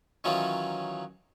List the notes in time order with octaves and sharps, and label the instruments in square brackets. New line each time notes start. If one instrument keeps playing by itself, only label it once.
[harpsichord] D#3 E3 F#3 C#4 D#4 F4